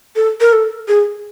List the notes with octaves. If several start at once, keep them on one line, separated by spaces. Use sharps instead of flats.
A4
A#4
A4
G#4